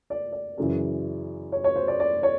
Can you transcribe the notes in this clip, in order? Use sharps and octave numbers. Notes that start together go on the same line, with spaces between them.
D5
D5
F#2 C#3 E3
C#5
C#5
C5
D5
D5
C#5